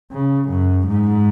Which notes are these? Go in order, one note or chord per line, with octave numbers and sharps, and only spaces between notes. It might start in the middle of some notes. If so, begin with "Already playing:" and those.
C#3
F#2
G#2